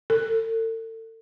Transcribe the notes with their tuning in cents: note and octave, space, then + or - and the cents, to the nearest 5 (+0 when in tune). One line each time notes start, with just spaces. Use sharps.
A4 +40